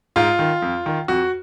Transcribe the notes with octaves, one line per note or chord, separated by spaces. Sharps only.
G#2 F4
D#3
F2
D#3
F2 F#4